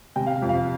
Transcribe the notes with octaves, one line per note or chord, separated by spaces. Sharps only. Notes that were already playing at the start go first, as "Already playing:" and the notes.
C3 G5
F5
F2
F5